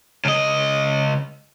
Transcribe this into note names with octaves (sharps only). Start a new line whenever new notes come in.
C#2 D#5